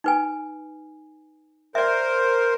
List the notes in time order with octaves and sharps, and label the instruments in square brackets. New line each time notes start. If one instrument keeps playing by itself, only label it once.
[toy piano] D#4 B4 G#5
[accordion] A#4 C5 [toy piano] D5 E5